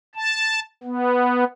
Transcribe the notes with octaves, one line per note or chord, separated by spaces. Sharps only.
A5
B3